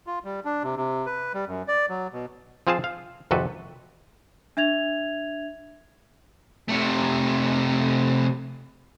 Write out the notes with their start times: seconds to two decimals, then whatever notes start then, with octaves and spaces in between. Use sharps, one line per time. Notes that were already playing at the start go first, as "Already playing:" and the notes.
0.07 F4
0.24 G3
0.45 D4
0.63 C3
0.76 C3
1.06 B4
1.34 G3
1.47 F#2
1.68 D5
1.89 F#3
2.13 B2
2.67 F3 C4 F4 G#4 C5 A5
2.84 F5
3.31 G#1 F2 C3 F#4 A4 B4
4.57 D4 E5 G#6 F7
6.68 C3 A3